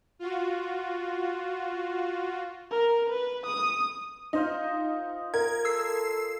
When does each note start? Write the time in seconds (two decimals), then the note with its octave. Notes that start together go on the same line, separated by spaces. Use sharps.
0.19 F4 F#4
2.71 A#4
3.10 B4
3.46 D#6
4.33 D#4 F4 C5 D#5
5.34 A#4 G#6
5.65 A4 E6 C7